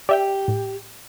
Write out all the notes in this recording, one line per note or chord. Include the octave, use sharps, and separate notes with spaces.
G4 D5 E5 G5
A2